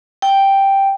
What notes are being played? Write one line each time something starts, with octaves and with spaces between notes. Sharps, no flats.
G5